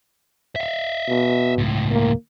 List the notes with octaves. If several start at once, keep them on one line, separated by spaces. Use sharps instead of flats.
E5 F5
B2
C#2 A2
A#3